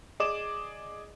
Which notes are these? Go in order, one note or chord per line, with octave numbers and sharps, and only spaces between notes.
G#4 D5 D#5 D6 E7